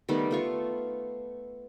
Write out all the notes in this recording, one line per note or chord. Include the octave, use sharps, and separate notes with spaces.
D#3 G3 A3 B3
A3 F4 C#6